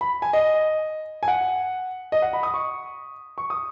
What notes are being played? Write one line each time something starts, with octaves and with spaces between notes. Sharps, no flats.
B5
G#5
D#5
G#5
F#5
D#5
F#5
B5
D#6
C#6
C#6
D#6